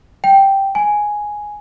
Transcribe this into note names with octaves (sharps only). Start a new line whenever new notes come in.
G5
G#5